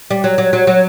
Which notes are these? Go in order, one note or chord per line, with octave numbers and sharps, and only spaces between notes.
G3
F#3
F#3
F#3
F#3